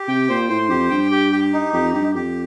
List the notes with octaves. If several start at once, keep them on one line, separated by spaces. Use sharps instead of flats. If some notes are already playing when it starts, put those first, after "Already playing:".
Already playing: G4
C3 G5
A#2 C5
A2 C5
F2 G4
G2 G5
G4
G4
D#4
F2 G4
G2 G4
F2 G4